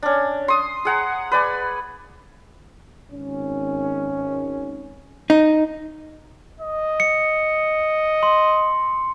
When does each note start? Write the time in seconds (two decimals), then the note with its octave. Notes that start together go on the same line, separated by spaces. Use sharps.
0.03 C#4 D4
0.48 C6 D#6
0.85 G#4 F#5 A#5
1.32 B4 D5 G#5
3.12 G#1 C#4
5.30 D#4
6.61 D#5
7.00 C#7
8.23 C6